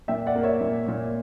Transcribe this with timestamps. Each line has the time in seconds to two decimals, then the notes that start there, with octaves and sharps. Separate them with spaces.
0.08 A#2 E5 G5
0.27 D5 F#5
0.36 A#3
0.43 C#5 E5
0.61 A#2
0.88 A#2